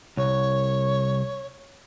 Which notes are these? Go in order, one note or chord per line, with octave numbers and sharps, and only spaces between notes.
C2 C#5